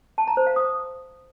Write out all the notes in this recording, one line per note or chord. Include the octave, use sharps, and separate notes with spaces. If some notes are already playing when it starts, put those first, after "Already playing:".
A5
A#5
C5
F5
D#6